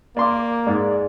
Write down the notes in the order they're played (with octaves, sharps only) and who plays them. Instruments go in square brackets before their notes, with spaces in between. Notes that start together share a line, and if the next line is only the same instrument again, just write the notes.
[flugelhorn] A#3 [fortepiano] D5 C6 D6
[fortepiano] G#2 G#3 [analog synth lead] D5